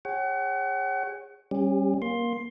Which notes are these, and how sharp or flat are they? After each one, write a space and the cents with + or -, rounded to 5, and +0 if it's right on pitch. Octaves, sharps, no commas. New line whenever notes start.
G#4 -25 C#5 -20 F#5 +35
G3 +0 C#4 -20 G4 +35
A#3 +20 C6 +15